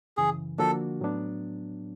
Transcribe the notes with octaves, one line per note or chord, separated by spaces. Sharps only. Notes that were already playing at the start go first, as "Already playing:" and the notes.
F#2 C#3 E3 G#4
D3 F3 A#3 D4 F#4 A4
A2 F#3 B3 D4